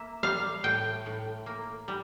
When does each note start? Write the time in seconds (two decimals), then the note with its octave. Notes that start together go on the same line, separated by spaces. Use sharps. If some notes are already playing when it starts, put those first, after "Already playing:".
Already playing: A#3 E5
0.23 G3 F5
0.64 A2 G5
1.06 A2
1.46 A#3
1.88 G3